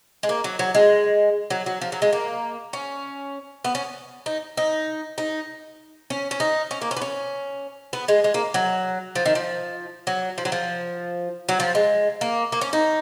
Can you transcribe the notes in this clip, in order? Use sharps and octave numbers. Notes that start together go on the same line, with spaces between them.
G#3
A#3
F#3
F#3
G#3
F#3
F#3
F3
F#3
G#3
A#3
C#4
B3
C#4
D#4
D#4
D#4
C#4
C#4
D#4
C#4
A#3
C#4
B3
C#4
B3
G#3
G#3
A#3
F#3
F3
D#3
F3
F#3
F3
F#3
F3
F#3
F3
G#3
A#3
A#3
C#4
D#4